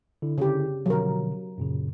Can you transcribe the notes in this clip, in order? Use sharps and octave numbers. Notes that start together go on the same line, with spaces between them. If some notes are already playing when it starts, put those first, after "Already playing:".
D3 E4
C#3 G4
B2 D3 F3 F#3 A#4
F#2 A#2 C#3